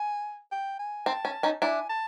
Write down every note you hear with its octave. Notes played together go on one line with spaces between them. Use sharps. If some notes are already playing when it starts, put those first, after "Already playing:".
Already playing: G#5
G5
G#5
C4 A5
C#4
C#4 D#4
D4 E4 G#5
A5